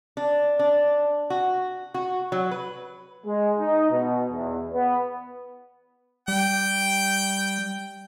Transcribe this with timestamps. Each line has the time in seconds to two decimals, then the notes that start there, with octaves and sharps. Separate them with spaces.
0.17 D4
0.59 D4
1.30 F#4
1.94 F#4
2.32 F#3
2.51 B4
3.26 G#3
3.58 D#4
3.91 B2
4.32 E2
4.73 B3
6.28 G3 G5